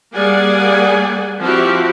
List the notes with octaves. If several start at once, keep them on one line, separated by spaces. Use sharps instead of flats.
G3 A#3 G#4 D5 F#5 G#5
F3 C4 E4 F#4 G4